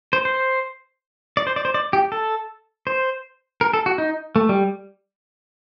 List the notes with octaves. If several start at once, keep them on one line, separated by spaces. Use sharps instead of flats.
C5
C5
D5
C5
D5
C5
D5
G4
A4
C5
A#4
A4
F#4
D#4
A3
G3